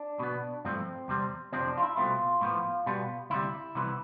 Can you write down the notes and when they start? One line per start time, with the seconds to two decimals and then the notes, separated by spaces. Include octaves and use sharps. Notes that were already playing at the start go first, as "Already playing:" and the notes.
Already playing: D4
0.19 B2 B3
0.65 G2 F3 A3 C4
1.08 E2 C3 G3 C4
1.53 F2 C3 F3 C4 D4
1.68 D4
1.77 F4
1.83 E4
1.97 C2 B2 A3 C4 F4
2.41 A2 F3 B3
2.86 B2 G3 B3
3.30 D2 C3 G3 E4
3.75 C2 C3 E3 B3